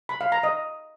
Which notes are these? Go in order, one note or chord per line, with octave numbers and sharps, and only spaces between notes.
B5
F5
A#5
D#5